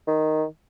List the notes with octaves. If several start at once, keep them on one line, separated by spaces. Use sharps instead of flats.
D#3